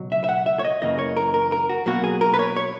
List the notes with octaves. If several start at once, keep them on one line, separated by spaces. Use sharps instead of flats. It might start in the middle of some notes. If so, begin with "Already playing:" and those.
Already playing: C#2 B2 F#3
E5
E5
F#5
E5
C#5
D#5
F#2 C#3 E3 A#3 D#5
C#5
A#4
A#4
A#4
F#4
B1 B2 F#3 A#3 F#4
G#4
A#4
B4
C#5
C#5